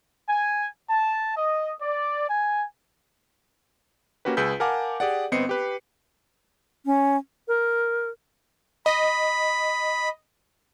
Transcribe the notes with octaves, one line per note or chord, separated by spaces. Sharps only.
G#5
A5
D#5
D5
G#5
A#3 C#4 F#4 G4 B4
C#2 G#4 B4 E6 G6 B6
A#4 F5 F#5 G#5 A5 D6
G4 G#4 D5 F#5
G1 B3 C4 D#5 C7 C#7
G4 B4
C#4
A#4
D#5 B5